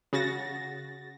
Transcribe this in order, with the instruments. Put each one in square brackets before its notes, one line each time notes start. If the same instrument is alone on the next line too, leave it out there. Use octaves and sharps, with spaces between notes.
[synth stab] C#3 F#4 A6 A#6